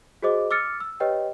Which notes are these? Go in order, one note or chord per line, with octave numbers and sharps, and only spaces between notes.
F#4 G#4 C5 D#5 D6
D6 E6 F6 A6 C#7
E6
G4 B4 C#5 D#5 G5